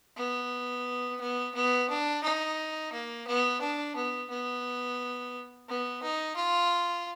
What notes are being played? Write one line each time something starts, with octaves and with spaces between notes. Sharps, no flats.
B3
B3
B3
D4
D#4
A#3
B3
D4
B3
B3
B3
D#4
F4